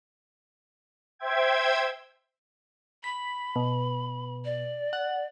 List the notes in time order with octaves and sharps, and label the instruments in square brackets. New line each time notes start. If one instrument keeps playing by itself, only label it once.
[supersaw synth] C5 E5 G5 G#6
[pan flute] B5 [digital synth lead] B6
[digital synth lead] B2
[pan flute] D5
[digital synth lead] F#5